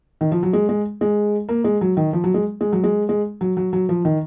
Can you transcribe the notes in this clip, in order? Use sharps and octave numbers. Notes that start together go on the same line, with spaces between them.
D#3
F3
F#3
G#3
G#3
G#3
A#3
G#3
F#3
D#3
F3
F#3
G#3
G#3
F#3
G#3
G#3
F#3
F#3
F#3
F3
D#3